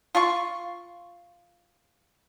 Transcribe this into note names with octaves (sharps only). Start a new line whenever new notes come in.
F4 C6 C#6